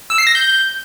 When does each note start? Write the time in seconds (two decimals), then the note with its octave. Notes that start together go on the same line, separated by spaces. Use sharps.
0.10 E6
0.18 C7
0.27 A#6
0.35 G6